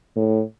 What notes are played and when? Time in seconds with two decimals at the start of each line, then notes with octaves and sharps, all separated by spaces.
0.16 A2